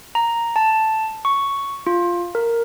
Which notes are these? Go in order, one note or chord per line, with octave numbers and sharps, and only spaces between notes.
A#5
A5
C#6
F4
A#4